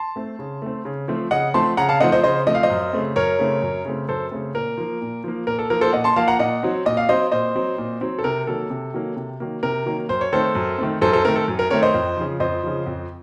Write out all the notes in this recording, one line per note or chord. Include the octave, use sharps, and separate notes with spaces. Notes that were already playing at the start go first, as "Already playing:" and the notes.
Already playing: A5 C6
A3 C4
C#3
A3 C4
C#3
F3 A3 C4
C#3 D#5 F#5
F3 A3 C4 A5 C6
C#3 F#5 A#5
F5 A5
F3 A3 C4 D#5 F#5
C5 D#5
C#3 C5 D#5
F3 A3 C4 D#5
F5
C5 D#5
F#2
C#3 A3 C4
F#2 A#4 C#5
C#3 A3 C4
F#2
C#3 A3 C4
F#2 A4 C5
C#3 A3 C4
A#2 A#4
F3 A#3
A#2
F3 A#3
A#2 A#4
A4
F3 A#3 A#4
A4 C5
A#2 D#5 F#5
A5 C6
F3 A#3 F5 A5
F#5 A#5
A#2 D#5 F#5
F#3 C4
A#2 D#5
F5
F#3 C4 C5 D#5
A#2 C5 D#5
F#3 C4
A#2
F#3 C4
A4
C3 A#4
D#3 F#3 A#3 A4
C3
D#3 F#3 A#3
C3
D#3 F#3 A#3
C3 A#4
D#3 F#3 A#3
F#2 C5
C#5
D#3 A3 C4 A4 C5
F#2
D#3 A3 C4
F#2 A4 C5
A4 C5
D#3 A3 C4 A#4
A4
F#2
A#4
D#3 A3 C4 A#4 C#5
C5 D#5
F2
C#3 F3
F2 C5 D#5
C#3 F3
F2